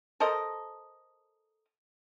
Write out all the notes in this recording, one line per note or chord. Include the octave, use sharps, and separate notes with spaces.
A4 A#4 C5 D#5